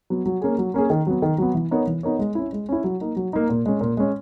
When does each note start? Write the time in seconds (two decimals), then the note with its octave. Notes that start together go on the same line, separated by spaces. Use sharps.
0.10 F#3 B3
0.26 F#3
0.41 A#3 C#4 G#4
0.58 F#3
0.74 A#3 C#4 G#4
0.90 D#3
1.07 F#3 B3
1.22 D#3
1.38 F#3 B3
1.54 E3
1.71 B3 D#4 A#4 C#5
1.87 E3
2.03 B3 D#4 A#4 C#5
2.19 G#3
2.35 C#4 E4
2.53 G#3
2.69 C#4 E4
2.84 F#3
3.01 A#3 D#4
3.16 F#3
3.33 A#3 D#4
3.50 A#2
3.66 G#3 C#4
3.81 A#2
3.97 G#3 C#4